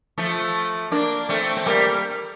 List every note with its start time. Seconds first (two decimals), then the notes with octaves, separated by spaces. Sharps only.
0.18 F3 A3
0.92 A#3 D4
1.29 A3 C4
1.57 C4
1.66 G3 A#3